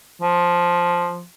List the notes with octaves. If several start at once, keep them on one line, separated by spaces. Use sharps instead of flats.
F3